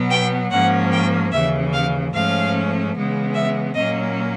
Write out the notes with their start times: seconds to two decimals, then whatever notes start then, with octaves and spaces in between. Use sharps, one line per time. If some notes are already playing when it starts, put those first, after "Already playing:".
Already playing: B2 F#3 B3
0.11 G5
0.51 G#2 F3 A#3 C#4 F#5
0.92 G5
1.32 D#2 C#3 E3 E5
1.73 F5
2.13 G#2 F3 A3 C#4 F5
2.94 C#3 E3 G#3 B3
3.34 E5
3.75 A#2 F#3 A#3 C#4 D#5